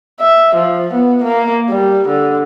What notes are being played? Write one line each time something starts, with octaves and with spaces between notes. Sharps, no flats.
E5
F3
B3
A#3
G3
D3